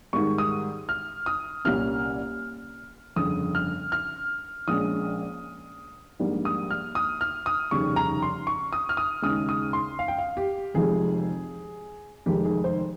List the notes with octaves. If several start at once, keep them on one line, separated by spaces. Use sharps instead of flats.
G#2 D#3 G3 C#6
D#6
F6
D#6
C2 A#2 G3 A#3 C#4 F6
G1 F2 C#3 D#6
F6
F6
A#1 A#2 G#3 C#4 D#6
A#1 G#2 G3 A#3
D#6
F6
D#6
F6
D#6
F1 D#2 C#3 G3 C#6
A#5
C6
C#6
D#6
F6
D#6
D#2 C#3 G#3 D#6
D#6
C6
F5
G5
F5
G4
F1 F2 C3 F3 G#3 G#4
F1 F2 D#3 G#3 G4
G#4
C5